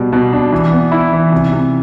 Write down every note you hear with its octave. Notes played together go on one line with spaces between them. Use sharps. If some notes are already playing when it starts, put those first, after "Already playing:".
Already playing: B2 G3
B2
D4
E3
B3
E4
E3
C3
C3